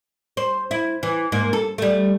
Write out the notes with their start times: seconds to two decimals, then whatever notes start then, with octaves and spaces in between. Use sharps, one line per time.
0.37 C5
0.71 E4
1.03 E3
1.32 G#2 A#3
1.53 A4
1.78 G3 A3